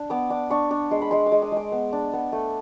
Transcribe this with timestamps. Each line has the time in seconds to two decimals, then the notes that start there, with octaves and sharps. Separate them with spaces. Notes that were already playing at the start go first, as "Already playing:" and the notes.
Already playing: D4
0.10 B3 D6
0.30 D4 D6
0.50 D4 C#6
0.71 D4 C#6
0.91 G#3 C6
1.02 B5
1.11 G#3 C6
1.26 D6
1.32 G#3
1.42 D#6
1.52 G#3 D6
1.72 B3
1.93 D4
2.13 B3
2.33 A3